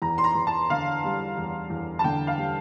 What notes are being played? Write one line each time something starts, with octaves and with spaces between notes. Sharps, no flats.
E2 A#5
C6
A#5
E2
A5
D3 F5
G3
E2
E2
A5
D3 G5
F5
G3